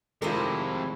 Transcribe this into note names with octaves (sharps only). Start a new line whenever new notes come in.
F2 C3 D#3 G#3 E4 F4 A#4 C5